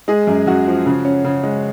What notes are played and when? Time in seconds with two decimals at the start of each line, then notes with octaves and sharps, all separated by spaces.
0.08 G#3 G#4
0.27 F#2
0.47 F#2 F#4
0.67 F3
0.86 C#3
1.05 C#4
1.25 C#3
1.43 G#3